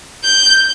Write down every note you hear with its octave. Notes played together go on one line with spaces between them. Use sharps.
G6